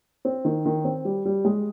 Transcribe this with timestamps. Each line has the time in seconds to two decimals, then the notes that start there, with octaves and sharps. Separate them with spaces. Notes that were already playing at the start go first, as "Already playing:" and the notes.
0.25 C4
0.45 D#3
0.66 D#3
0.85 C4
1.05 G3
1.25 G3
1.45 G#3